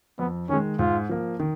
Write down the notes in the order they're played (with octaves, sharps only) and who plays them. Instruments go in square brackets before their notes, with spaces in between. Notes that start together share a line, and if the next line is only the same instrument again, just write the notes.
[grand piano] F2 [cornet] B3
[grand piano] D#3 G#3 [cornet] C#4
[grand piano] G#2 [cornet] F4
[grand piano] F3 A#3
D#3